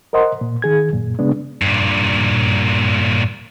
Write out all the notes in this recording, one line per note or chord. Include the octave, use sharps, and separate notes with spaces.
A#4 C5 D#5 F#5 C6
A#2
D#3 G#4 G#6
F#2 A#2
C#3 G#3 B3 D4
G2 A#2